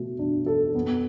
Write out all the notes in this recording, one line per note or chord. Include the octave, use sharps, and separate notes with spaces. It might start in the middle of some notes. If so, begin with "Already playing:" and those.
Already playing: B2 A3
D4
A4
B3